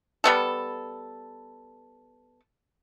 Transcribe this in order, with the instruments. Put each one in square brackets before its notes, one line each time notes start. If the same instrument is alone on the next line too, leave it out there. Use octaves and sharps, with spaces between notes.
[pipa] G3 B3 A4